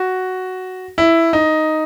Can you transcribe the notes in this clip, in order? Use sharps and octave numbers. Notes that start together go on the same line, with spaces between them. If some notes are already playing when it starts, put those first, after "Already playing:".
Already playing: F#4
E4
D#4